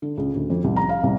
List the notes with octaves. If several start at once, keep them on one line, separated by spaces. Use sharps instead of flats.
D3
C#2
D2
F2
C2
A#5
F5
C2